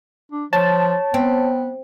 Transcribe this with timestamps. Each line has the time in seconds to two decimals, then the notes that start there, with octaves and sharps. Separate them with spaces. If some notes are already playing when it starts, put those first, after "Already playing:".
0.31 D4
0.53 F3 C#5 A5
1.14 B3 C4